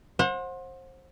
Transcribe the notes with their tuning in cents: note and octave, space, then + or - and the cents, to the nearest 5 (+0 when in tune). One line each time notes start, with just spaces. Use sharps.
C5 +25 F#5 -30